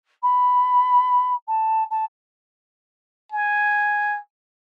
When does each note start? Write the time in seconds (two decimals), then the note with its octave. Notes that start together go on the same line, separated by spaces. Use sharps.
0.22 B5
1.48 A5
1.90 A5
3.32 G#5